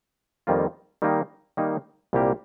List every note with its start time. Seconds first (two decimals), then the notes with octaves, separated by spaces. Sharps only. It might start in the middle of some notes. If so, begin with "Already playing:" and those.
0.47 F2 D#3 G3 A#3 F4
1.02 D#3 G3 A#3 D#4
1.57 D#3 G3 A#3 D#4
2.13 C2 A#2 G3 A#3 G4